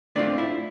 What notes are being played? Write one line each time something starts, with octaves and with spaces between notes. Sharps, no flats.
A3 C4 D4 F4 D5
E4 E5